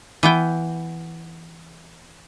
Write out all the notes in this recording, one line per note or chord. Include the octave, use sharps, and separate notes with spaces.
E3 B3 G5